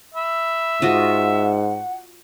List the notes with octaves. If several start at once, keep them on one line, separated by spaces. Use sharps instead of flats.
E5 B5
G#2 F4 F#4 D#5 F#5